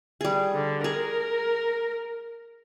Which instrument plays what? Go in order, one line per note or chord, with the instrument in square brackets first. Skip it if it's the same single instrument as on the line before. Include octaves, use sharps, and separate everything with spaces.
[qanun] G3 G#4
[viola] D3
[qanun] G#4 [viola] A#4